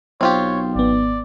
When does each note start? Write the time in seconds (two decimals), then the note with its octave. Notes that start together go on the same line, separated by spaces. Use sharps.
0.21 B1 C4 F4 G4 C#5
0.75 G#1 B3 D5